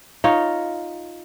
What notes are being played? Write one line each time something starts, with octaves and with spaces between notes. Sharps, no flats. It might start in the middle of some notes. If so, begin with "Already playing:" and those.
D#4 F4 C#5